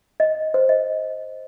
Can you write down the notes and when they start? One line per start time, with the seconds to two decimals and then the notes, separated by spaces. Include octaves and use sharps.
0.20 D#5
0.54 C5
0.69 D#5